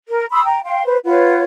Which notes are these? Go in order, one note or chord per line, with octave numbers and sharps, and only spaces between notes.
A#4
B5 C6 D#6 E6
G5 A#5
F5 G5 C6
B4 C5
F4 B4 C#5 F#5